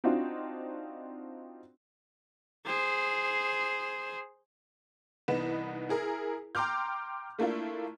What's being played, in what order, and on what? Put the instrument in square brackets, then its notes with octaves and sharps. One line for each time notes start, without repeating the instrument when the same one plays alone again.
[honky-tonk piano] C4 D4 D#4 F4 F#4
[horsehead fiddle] G#4 C5
[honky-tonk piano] C2 E3 B3 D#4 B4 E7
E4 G#4 A#4
G5 A#5 C6 D6 F6 G6
A3 A#3 D4 E4 F4